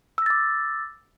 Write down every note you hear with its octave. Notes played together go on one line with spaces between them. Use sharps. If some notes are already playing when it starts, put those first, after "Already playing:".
D6 E6 A6 A#6